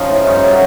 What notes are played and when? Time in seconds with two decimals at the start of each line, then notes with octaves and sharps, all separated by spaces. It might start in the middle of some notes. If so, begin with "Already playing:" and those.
Already playing: F3 C#4 D#4 F4
0.10 A2
0.26 G2 C#4 D#4
0.43 F#3